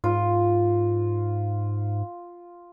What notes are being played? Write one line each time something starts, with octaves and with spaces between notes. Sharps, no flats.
G#2 F4